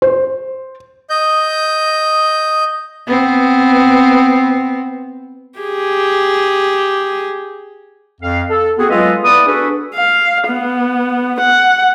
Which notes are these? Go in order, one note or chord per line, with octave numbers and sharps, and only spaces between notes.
C5
D#5 G6
B3 C4
G4 G#4
F2 F5
A4
B3 C4 F#4 G#4
F#3 G#3 F4 A4 B4 D#5
B3 E4 B4 D5 D#6
D4 F#4 G#4 A4 B4
F5
B3
F#5